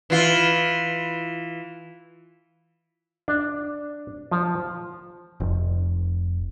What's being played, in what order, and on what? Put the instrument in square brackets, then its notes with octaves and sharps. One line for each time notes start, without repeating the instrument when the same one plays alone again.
[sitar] E3 F4
[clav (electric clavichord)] D4
F3
[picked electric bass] F1